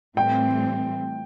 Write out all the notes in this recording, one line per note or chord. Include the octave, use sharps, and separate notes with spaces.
A2 E3 G3 C4 G5